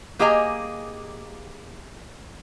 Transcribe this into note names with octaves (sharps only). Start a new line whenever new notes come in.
A#3 G4 G#4 D#5 G#5 A#5